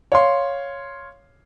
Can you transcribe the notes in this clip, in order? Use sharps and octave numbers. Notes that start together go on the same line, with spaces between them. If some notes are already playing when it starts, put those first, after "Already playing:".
C#5 F5 C6